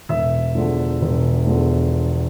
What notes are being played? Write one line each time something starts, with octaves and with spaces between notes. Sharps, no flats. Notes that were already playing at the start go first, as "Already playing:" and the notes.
E1 E5
E2 D3 F3
E1
E2 D3 F3